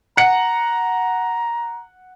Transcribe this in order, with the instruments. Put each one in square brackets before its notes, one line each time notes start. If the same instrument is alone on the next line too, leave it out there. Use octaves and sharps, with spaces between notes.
[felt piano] F#5 C#7 [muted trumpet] A#5